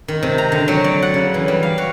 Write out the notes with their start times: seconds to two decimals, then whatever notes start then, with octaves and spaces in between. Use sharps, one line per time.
0.08 D#3
0.23 C3
0.38 A#5
0.52 D3
0.68 F#3
0.84 D5
1.02 F#5
1.14 C#3
1.34 E3
1.48 G3
1.63 F5
1.78 F#4